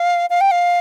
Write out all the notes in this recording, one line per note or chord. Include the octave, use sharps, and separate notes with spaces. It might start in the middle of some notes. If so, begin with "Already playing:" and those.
Already playing: F5
F5
G5
F5